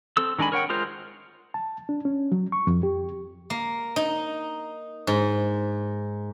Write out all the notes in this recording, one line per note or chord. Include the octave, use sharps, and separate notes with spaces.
C4 A4 E6
D#3 G#3 D4 G#5 B5
A#4 C#5 F#5 G5
G#3 F4 A#4 C5
A5
D4
C#4
F#3
C#6
F2
G4
A#3
D#4
G#2